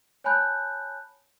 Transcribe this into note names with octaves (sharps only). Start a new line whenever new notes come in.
C#5 G#5 A5 B5 F#6 G6